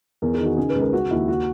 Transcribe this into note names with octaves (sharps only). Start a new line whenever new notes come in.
E2 A#4
G#4
D#3
F#4
C#3 G#4
B4
C#2
A#4
C#3 F#4
D#2 E4
F#4